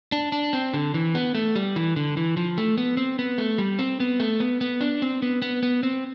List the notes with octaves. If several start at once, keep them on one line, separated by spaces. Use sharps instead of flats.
D4
D4
C4
D3
E3
B3
A3
G3
E3
D3
E3
F3
A3
B3
C4
B3
A3
G3
C4
B3
A3
B3
B3
D4
C4
B3
B3
B3
C4